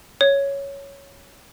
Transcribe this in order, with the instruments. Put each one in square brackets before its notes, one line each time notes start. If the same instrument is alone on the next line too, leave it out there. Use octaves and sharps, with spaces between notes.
[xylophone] C#5